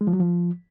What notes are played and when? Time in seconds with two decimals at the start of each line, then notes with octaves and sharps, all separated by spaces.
0.01 G#3
0.07 F3
0.13 F#3
0.19 F3